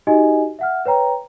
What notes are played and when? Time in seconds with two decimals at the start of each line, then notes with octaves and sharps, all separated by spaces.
0.07 D#4 F#4 G4 D#5 G#5
0.59 E5 F#5 F6
0.86 B4 C#5 G5 A#5